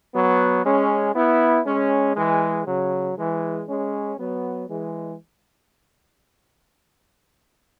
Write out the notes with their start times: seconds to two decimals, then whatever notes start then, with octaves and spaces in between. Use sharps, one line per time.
0.14 F#3 B3
0.64 G#3 C#4
1.15 B3 E4
1.66 G#3 C#4
2.16 E3 G#3
2.67 C#3 F#3
3.17 E3 G#3
3.67 G#3 C#4
4.18 F#3 B3
4.69 E3 G#3